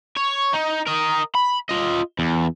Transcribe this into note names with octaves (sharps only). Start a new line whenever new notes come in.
C#5
D#4
A#4 D#5
B5
F4 D#5
E2